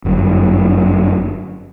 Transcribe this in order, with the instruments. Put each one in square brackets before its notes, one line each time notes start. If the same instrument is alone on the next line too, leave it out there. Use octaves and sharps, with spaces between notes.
[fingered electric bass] G1 F#2